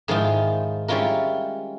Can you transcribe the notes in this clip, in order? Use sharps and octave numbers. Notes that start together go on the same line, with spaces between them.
G#2 D#3 F3 E4 F4
G3 G#3 C#4 E4 F4 A#4